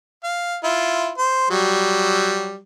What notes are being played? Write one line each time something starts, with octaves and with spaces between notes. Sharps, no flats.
F5
E4 F4
C5
F#3 G3